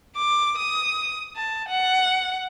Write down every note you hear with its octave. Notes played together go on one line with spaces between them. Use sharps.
D6
D#6
A5
F#5